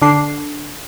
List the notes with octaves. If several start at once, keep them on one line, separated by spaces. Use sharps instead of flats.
D3 D4 C7